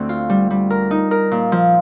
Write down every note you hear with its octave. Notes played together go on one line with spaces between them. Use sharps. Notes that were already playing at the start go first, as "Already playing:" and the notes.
Already playing: D2 C4
F4
G3
G3
A#4
D#4
A#4
A#2
F3